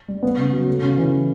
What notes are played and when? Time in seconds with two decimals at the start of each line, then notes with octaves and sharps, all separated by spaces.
0.08 G3
0.23 B3
0.37 C#3
0.53 F#3
0.68 A3
0.83 C#3
0.98 E3